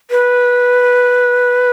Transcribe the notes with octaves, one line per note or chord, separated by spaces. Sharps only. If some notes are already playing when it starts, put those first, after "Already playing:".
B4